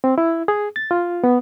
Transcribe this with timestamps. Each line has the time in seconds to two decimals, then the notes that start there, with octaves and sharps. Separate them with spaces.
0.04 C4
0.18 E4
0.48 G#4
0.76 A6
0.91 F4
1.24 B3